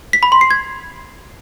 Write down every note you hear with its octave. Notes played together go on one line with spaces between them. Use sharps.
B6
B5
C6
C7
G#6